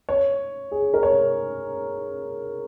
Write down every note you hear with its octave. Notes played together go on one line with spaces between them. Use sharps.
C#5
G#4
A#4
C#5